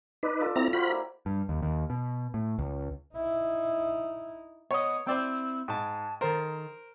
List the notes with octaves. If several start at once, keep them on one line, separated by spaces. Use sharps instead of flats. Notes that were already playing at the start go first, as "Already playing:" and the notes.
D#4 B4 D5
F4 A4 A5
C4 E4 A#5
F4 F#4 C5 G5 B5
A#3 E4
G2
D#2
D#2
B2
A2
C#2
D#4 E4
B3 C#5 D#5
C4 E4 C5 D5 G5
G#2 G5 A5
D#3 A4 A#4 C5